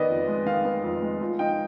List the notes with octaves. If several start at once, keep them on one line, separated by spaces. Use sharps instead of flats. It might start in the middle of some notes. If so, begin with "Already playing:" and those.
Already playing: D#3 B3 D5 D#5
F2
G#3
D#3 F5
B3
F2
G#3
F3
D#4 G5